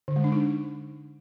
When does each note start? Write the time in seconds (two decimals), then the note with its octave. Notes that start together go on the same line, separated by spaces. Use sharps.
0.08 D3
0.16 G#3
0.24 D4
0.32 D#4